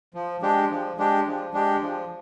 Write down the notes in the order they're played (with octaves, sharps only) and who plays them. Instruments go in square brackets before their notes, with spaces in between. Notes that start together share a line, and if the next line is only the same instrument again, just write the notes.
[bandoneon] F3
G#3 D4 G4
F3
G#3 D4 G4
F3
G#3 D4 G4
F3